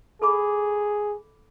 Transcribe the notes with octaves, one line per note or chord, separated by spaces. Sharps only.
G#4 A4 B5 D6